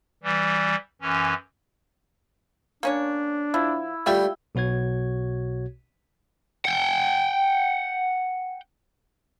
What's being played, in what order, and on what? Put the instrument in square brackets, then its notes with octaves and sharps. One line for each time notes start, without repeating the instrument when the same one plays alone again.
[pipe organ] E3 G3
F#2 E3 C#4
[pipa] A#3 C#4 C#5 [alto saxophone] D4
[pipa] F3 [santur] E4
[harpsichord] G3 A3 [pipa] F4 E5 G5
[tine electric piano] B1 B2 F#4 C#5 G#6
[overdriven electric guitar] F#5 G5